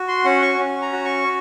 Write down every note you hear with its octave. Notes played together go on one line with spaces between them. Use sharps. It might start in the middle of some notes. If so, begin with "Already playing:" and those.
Already playing: F#4
C6
C#4 F#5
C#6
C#4
A#5
F#4
C#6